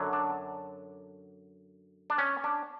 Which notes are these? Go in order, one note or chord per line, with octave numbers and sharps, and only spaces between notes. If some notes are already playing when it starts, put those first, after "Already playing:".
Already playing: F#2 D3 F#3
D4
D4
C#4
D4